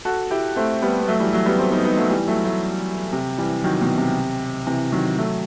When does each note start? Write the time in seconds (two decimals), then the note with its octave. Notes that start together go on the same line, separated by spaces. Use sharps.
0.05 F#4 A4
0.31 E4 G4
0.56 A3 C4
0.82 G3 B3
1.01 B3
1.08 F#3 A3
1.20 E3 G3
1.33 F#3 A3
1.46 G3 B3
1.59 A3 C4
1.72 B3 D#4
1.84 B3 D#4
1.97 F#3 A3
2.10 E3 G3
2.27 F#3 A3
2.44 F#3 A3
3.13 C3
3.38 E3 G3
3.64 D#3 F#3
3.81 B2 D#3
3.98 C3
4.67 C3 E3
4.92 D#3 F#3
5.18 F#3 A3